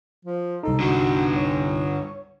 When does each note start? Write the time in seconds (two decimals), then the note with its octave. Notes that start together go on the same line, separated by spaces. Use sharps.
0.25 F3
0.63 C2 D#4 A4
0.80 G2 D3 F#4
1.36 C#5